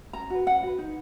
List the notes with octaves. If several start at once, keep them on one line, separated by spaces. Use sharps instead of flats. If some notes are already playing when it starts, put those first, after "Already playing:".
C#4 A#5
F#4 B4
C#4 F#5
F#4 B4
D#4